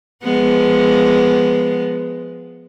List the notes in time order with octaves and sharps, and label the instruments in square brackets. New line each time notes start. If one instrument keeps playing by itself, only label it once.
[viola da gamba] F3 G#3 B3